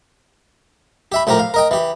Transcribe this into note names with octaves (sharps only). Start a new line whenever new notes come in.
G4 E5 B5
A2 F3 F4 G4 A#4
F5
A#4 D#5 G5
E3 G4